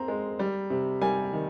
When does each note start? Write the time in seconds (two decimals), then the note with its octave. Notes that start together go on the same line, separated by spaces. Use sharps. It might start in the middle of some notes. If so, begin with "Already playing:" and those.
Already playing: C4 A#5
0.08 G#3
0.39 G3
0.70 C3
1.01 G3 G#5
1.33 D#3